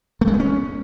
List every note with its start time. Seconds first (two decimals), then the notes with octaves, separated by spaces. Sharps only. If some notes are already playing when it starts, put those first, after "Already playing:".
0.21 A3
0.27 G#3
0.34 B3
0.40 C#4